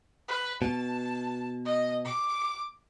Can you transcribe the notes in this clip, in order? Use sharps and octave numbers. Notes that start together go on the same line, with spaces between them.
B4
B2 A5
D#5
D6